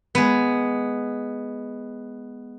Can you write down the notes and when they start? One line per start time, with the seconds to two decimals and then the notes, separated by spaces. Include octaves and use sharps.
0.15 G#3 B3